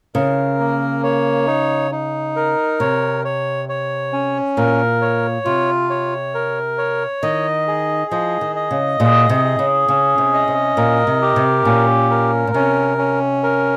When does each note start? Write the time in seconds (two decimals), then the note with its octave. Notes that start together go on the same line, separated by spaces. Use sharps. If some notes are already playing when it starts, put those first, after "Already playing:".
0.15 C#3 A#4
0.59 A#3
1.03 C#5
1.47 D#4
1.92 D#4
2.36 A#4
2.80 C3 C#5
3.25 C#5
3.69 C#5
4.13 C#4
4.57 A#2 A#4
5.01 C#5
5.45 C3 F4
5.90 C#5
6.35 A#4
6.78 C#5
7.23 D#3 D#5
7.67 G#4
8.11 F3 D#5
8.41 D#3
8.56 D#5
8.71 C#3
8.99 A#2 G#4
9.29 C3
9.44 G#4
9.59 C#3
9.88 C#3 C#4
10.18 C3
10.33 D#5
10.48 C3
10.77 A#2 A#4
11.07 C3
11.22 G4
11.36 C3
11.65 A#2 C#4
12.10 A#4
12.47 A#2
12.54 C3 C#4
12.98 C#4
13.43 A#4